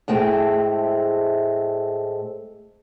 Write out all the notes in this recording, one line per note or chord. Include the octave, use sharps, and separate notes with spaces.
A2 G#3 A3 C4